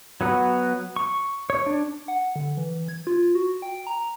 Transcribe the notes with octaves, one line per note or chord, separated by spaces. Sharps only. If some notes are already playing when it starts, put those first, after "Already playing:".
F#3 B3 F#4
C#6
C#5
D4
F#5
D3
E3
G#6
F4
F#4
G5
A#5